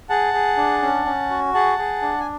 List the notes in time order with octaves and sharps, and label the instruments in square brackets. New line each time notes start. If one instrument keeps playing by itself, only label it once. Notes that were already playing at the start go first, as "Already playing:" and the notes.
[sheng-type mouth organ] G#4 F#5 A5
G#4
D4
C#4
C#4
F#4
G#4 F#5 A5
G#4
D4
G#5